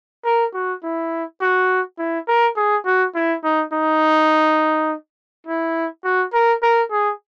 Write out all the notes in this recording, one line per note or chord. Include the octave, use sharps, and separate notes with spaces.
A#4
F#4
E4
F#4
E4
A#4
G#4
F#4
E4
D#4
D#4
E4
F#4
A#4
A#4
G#4